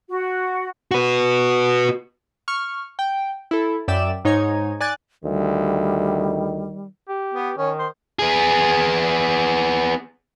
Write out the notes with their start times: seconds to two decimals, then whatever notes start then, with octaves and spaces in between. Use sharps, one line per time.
0.08 F#4
0.91 F#4 B4
2.48 C#6 F6
2.99 G5
3.51 E4 A4
3.88 F#2 D5 E5 G5 E7
4.25 G#2 D#4 C#5 G#5 G#6
4.80 D5 G#5 F#6 G#6 A6
5.24 D2 D#3 G3
7.09 G4
7.34 B3
7.57 D#3 C#4
7.79 C5
8.19 B3 G#4